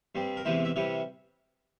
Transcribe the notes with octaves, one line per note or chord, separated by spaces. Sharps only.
G2 G3 C4
A#4
E2 C3 E3 G#3 E4 C5
E5
C3 E3 G3 C#5